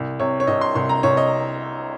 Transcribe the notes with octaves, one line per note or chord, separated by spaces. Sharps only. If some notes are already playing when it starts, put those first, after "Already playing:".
Already playing: C2
C3 C#5
C#5
C2 D#5
C6
C2 C6
A#5
C2 C#5
D#5